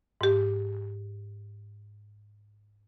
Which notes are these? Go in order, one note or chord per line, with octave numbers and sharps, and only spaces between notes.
G#2 G4